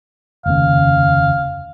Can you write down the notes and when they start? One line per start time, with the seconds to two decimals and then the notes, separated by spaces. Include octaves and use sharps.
0.46 F1 D#2 C#3 F5